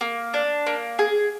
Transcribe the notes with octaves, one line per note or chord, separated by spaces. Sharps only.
A#3
D4
A#3
G#4